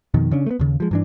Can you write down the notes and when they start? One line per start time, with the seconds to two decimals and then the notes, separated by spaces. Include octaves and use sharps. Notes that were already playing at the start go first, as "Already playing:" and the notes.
0.14 F2 B2 D#3
0.31 C#3 C#4 D4
0.46 A3 B3
0.59 D#2 C#3
0.80 F3 G#3
0.91 G2 E3 D4